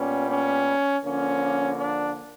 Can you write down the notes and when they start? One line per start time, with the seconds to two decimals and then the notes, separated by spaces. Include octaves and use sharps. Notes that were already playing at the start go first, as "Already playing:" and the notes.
Already playing: A#2 G3 B3 C#4
0.30 C#4
1.03 D3 F3 A#3 C#4
1.77 D4